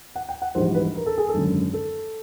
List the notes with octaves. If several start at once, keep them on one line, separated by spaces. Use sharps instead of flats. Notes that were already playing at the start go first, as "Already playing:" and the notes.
F#5
G5
F#5
A#1 G#2 E3 G3 C5
B4
A#4
A4
G#4
A4
G#1 F#2 D3
A4